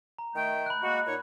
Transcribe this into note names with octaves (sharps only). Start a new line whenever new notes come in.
A#5
D#3 A3 G5
B5 F#6
G#3 A#3 F#4
A#2 D#4 C#5